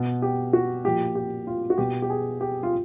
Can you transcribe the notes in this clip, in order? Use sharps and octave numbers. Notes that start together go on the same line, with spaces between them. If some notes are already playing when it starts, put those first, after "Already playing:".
Already playing: B2
G4
F#4
A#2 F3 G4
G4
F4
F#4
B2 G4
G4
G#4
G4
F4